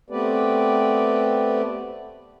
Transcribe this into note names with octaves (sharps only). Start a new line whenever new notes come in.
A3 B3 C4 G4 B4 D5